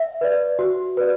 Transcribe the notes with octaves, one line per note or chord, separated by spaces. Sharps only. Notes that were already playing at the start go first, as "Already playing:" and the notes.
Already playing: E5
B4 D5
F#4
B4 D5